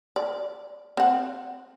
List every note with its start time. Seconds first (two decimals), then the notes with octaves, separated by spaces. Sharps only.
0.16 D5
0.97 C4 F#5